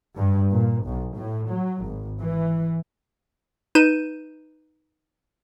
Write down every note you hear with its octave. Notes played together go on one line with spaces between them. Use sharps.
G2
A#2
B1
A2
F#3
G#1
E3
D#4 B4 G6 D#7 E7